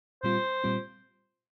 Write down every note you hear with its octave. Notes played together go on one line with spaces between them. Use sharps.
A#2 G3 C4 F4 C5
A#2 G3 C4 F4